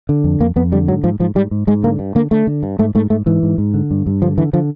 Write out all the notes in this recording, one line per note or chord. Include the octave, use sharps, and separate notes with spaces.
D3
F2
F2 A#3
F2 B3
D3 G3
G#2 F#3
G#2 F3
G#2 F3
G#2 G3
G#2
G#2 G#3
D3 A#3
G2
D3 A#3
D3 A3
D3
G2
G#2 A3
G#2 A3
G#2 A3
G#2 E3
G#2
G#2
D3
G2
G2
D3 F3
D3 E3
D3 F3